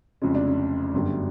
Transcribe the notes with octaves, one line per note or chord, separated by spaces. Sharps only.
F1 F2 C#3 F3 G#3 C#4
D4
C#4
G1 F#2 D3 G3